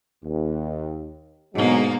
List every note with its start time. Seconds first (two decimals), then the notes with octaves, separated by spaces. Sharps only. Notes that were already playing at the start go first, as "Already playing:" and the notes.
0.24 D#2
1.54 G#2 B2 D3 F#3 G#3 A#3